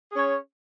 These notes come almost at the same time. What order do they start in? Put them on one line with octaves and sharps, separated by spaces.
G#4 C#4 C#5